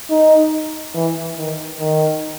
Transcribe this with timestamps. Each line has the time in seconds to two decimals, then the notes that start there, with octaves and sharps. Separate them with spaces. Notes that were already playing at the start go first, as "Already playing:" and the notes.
0.10 D#4
0.95 E3
1.37 D#3
1.80 D#3